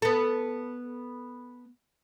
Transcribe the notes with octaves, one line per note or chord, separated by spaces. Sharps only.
B3 A4